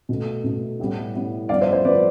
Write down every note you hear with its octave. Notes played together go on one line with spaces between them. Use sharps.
B2 A3
B2 A3
A2 G3 B3
A2 G3 B3
G2 F3 B3 D5 F5
C5 E5
C5
F3 B3 B4 D5